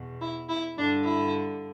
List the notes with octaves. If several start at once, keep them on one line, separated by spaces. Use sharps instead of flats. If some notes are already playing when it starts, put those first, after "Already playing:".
Already playing: E2 B2
E4
E4
G2 D3 D4
E4